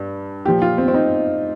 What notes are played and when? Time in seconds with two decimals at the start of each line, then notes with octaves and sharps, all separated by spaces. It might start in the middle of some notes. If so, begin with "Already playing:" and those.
Already playing: G2
0.45 A#2 F3 G4
0.62 F4
0.78 C4
0.88 C4
0.94 D#4